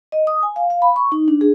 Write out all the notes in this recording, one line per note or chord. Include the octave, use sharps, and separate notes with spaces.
D#5
D#6
G#5
F5
F5
B5
C#6
D#4
D4
G#4